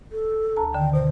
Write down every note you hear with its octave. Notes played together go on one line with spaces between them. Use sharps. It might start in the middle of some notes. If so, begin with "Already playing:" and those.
A4
D2 A5 A#5
D3 D#3 G5
B2 C5